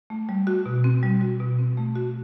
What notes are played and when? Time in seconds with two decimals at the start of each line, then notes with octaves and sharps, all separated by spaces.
0.10 A3
0.29 G3
0.47 F#4
0.66 B2
0.84 C4
1.03 G3
1.21 F#4
1.40 B2
1.59 C4
1.77 A3
1.95 F#4